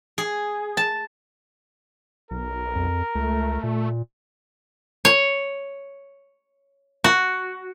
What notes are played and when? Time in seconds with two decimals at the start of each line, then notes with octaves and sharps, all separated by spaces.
0.18 G#4
0.77 A5
2.31 B1 A#4
2.75 F2
3.15 C#2 A3
3.63 A#2
5.05 C#5
7.04 F#4